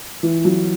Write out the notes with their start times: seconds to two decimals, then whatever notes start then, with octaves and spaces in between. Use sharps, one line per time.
0.23 E3
0.45 F#3